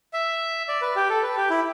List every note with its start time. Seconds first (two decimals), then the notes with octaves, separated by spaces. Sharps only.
0.13 E5
0.68 D5
0.82 B4
0.96 G4
1.09 A4
1.23 B4
1.37 G4
1.50 E4